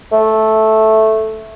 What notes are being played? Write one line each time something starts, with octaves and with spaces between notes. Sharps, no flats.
A3